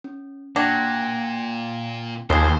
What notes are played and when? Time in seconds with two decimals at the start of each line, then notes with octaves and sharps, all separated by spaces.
0.04 C#4
0.56 A#2 D4 F#4 G5 G#6 A#6
2.30 D#2 F3 G#4 C5